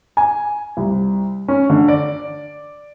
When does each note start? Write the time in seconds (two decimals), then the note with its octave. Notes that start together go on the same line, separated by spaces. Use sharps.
0.17 G#5
0.77 C2
1.48 C#4
1.70 D3
1.88 D5